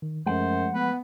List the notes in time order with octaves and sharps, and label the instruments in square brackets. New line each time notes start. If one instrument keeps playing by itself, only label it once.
[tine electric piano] D#3
[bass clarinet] F#2 [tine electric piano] F3 G#3 A3 [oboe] C5 [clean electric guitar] F#5
[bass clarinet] B3 [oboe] B4